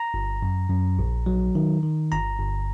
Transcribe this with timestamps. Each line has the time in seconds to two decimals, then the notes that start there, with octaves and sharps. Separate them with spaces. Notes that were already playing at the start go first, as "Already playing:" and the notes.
Already playing: A#5
0.14 G1
0.42 F#2
0.70 F#2
0.99 A#1
1.26 F#3
1.55 D#3
1.83 D#3
2.12 G1 A#5
2.39 G1